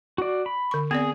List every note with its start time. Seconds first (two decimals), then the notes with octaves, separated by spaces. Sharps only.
0.18 F#4 D5
0.46 B5
0.71 D3 C#6
0.91 B3 C4 G#4 D5